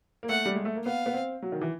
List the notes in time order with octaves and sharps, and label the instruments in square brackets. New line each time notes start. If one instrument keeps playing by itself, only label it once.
[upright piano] A#3
[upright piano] A3 [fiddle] F#5
[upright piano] G3
G#3
A3
A#3
[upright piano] B3 [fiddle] F5
[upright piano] B3
C4
F#3
D#3
E3